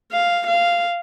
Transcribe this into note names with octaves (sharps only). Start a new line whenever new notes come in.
F5
F5